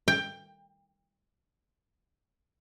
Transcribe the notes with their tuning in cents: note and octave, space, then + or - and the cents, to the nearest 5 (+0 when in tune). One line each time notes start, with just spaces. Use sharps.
G5 +15